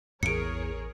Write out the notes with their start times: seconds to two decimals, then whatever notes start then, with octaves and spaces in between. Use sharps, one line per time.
0.23 A1 E2 G#4 A#4 C#5 C#7 D7